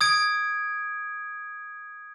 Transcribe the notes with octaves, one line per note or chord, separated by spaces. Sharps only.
D#6 G#6 D7